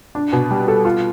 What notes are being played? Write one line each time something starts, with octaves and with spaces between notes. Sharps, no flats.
D4
B2
G3
A4
F4